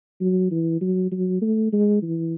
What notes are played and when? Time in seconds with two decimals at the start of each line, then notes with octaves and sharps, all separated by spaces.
0.20 F#3
0.51 E3
0.81 F#3
1.12 F#3
1.42 A3
1.73 G#3
2.02 E3